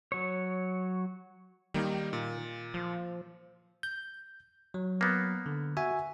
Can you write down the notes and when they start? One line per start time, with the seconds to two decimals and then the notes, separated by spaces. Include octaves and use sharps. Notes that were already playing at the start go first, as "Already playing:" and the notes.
0.12 F#3 C#5
1.74 D#3 G3 A#3 D#4
2.13 A#2
2.74 F3
3.83 G6
4.74 F#3
5.01 A#3 B3
5.46 D3
5.77 F#4 E5 G#5